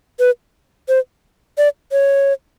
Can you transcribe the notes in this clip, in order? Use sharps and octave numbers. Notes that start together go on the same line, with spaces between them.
B4
C5
D5
C#5